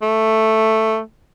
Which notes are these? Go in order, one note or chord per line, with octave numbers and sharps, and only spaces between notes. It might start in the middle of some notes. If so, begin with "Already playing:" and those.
A3